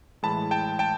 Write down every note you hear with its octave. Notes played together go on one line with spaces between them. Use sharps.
A2 E3 G#3 A5 B5
G5 A5
G5 A5